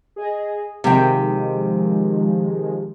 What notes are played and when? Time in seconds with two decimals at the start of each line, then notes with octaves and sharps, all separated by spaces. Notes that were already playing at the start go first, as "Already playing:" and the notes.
0.16 G#4 D#5
0.84 C3 D#3 F3 G#3 G5